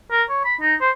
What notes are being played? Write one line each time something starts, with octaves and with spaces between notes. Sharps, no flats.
A#4
C#5
B5
D#4
C5